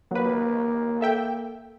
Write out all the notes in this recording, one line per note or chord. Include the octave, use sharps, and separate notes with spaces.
F#3 A#3 B4
A4 E5 G5